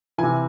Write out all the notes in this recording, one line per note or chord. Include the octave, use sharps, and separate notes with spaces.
C3 E3 G#5